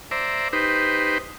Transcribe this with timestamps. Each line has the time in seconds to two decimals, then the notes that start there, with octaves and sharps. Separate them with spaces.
0.11 C5 D5 E5 A#5
0.53 D#4 G4 B4 C5